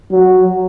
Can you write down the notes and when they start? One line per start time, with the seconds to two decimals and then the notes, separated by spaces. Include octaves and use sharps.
0.12 F#3